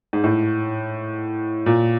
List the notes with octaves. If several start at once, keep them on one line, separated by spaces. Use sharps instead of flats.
G#2
A2
A#2